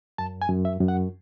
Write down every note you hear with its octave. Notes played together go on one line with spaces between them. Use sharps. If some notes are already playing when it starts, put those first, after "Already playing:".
F#2 A5
G#5
F#2
E5
F#2
F#5